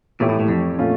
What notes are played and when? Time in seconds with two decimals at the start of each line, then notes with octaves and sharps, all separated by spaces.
0.20 A#2 E3 A3 E4 G4 C#5
0.29 A2
0.40 A2
0.48 F2
0.78 A#2 A3 C#4 F4